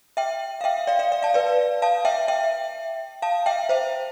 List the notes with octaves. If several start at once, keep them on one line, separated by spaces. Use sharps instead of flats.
E5 G5
F5
E5 G5
D5 F5
D5 F5
D5 F5
F5 A5
B4 D5
F5 A5
E5 G5
E5 G5
F5 A5
E5 G5
C5 E5